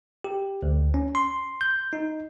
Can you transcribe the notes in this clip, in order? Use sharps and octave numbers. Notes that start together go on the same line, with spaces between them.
G4
D2
C#4
C6
G6
D#4